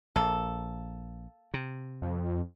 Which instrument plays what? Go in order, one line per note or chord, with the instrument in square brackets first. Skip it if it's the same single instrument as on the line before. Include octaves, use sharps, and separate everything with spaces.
[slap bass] A#1 [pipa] A#3 A4
[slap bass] C3
[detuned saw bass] F2